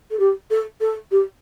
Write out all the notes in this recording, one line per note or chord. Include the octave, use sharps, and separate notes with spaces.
A4
G4
A4
A4
G4